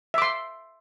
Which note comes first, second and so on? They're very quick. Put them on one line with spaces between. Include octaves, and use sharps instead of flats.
E5 D6 C6